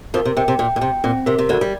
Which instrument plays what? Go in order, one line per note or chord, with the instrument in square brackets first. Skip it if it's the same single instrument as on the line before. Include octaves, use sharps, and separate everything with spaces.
[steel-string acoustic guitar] F2 F3 [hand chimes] A#4
[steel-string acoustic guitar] C3
[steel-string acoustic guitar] C3 [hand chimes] G5
[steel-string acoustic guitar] C3
[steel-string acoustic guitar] A#2 [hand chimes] G5
[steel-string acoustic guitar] A#2
[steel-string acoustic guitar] C3 [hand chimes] G5
[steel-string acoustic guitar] A#2 [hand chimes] C4
[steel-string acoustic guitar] C3 [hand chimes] A#4
[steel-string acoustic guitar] C3
[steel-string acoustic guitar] D2 D3 [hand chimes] D5
[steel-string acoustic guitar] G3